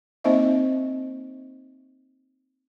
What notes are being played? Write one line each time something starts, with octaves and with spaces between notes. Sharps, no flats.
A#3 C4 D#4 C5 D#5 E5